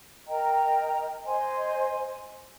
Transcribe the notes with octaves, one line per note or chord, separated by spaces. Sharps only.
A#4 D#5 G5 A#5
C5 D#5 G#5 C6